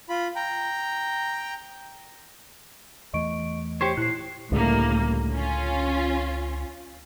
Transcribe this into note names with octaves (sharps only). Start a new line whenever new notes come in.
F4 B5
G5 A#5
E2 E3 A3 D#5 C#6 D7
G4 C5 C#5 C7 C#7
A#2 E4 F#6 C7
C#2 A2 D3 G3 A#3
C#4 F4